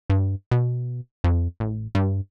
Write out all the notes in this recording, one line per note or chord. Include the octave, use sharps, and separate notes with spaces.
G2
B2
F2
A1
G2